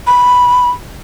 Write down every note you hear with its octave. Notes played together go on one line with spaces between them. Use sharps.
B5